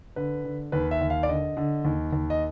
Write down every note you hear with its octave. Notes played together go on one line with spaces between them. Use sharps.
D3 B4
D3
D#2 B4
E5
D#2
F5
D5
D3 D#5
D3
D#2
D#2
D#5